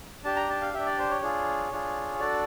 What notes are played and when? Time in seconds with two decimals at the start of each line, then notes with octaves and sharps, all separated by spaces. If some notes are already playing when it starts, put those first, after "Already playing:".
0.24 D4 G4 A5
0.36 A#5
0.49 A5
0.62 F5
0.73 D4 G4 E5
0.85 D5
0.98 C5
1.10 C#5
1.22 D4 F4 G#4
1.71 D4 F4 G#4
2.19 D4 F#4 A4 D5